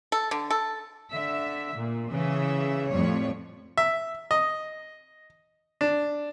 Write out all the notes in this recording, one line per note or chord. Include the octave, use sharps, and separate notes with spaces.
A4
D3
A4
D3 E5
A#2
C#3 E3 E5
F2 A2 G3 C#5
E5
D#5
D4